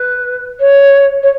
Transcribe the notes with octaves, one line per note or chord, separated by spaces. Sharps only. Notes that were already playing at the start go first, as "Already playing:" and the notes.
Already playing: B4
C#5
C#5